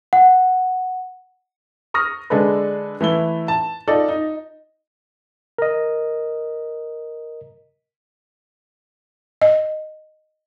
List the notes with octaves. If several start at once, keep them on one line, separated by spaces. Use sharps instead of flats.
F#5
C#6 D#6 F6 A#6
D3 G#3 D4 G#4 A4 B4
E3 A3 E4 G7
A5
D#4 F4 A4 D5
D#4
A#4 D#5
D#5